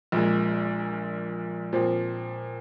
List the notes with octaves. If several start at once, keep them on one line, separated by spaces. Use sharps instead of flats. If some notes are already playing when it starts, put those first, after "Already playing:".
A#1 A#2 G#3
A#2 F3 C4